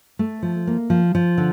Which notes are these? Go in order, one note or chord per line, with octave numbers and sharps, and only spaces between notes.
A3
F3
A#3
F3
F3
D3